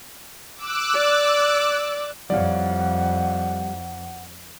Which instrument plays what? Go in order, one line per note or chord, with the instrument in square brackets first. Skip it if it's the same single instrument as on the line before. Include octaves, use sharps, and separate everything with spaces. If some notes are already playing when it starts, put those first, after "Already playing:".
[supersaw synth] D6 E6 F#6
[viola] D5
[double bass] F2 [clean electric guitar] G3 E4 C#5 [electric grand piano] D5 F5 [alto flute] F#5